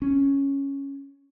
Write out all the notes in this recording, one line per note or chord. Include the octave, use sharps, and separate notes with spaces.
C#4